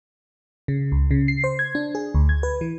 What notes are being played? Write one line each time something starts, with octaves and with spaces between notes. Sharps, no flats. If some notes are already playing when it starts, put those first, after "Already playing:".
C#3
C#2
C#3
C7
C5
G#6
D4
G#4
D2
G#6
B4
E3